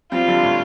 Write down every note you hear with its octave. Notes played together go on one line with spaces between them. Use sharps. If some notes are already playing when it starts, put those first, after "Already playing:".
G3 C4 F4
D3 G3
A2